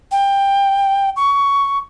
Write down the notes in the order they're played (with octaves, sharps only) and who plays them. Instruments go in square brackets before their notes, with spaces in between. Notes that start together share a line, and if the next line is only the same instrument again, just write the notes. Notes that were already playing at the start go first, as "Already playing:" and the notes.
[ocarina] G5
C#6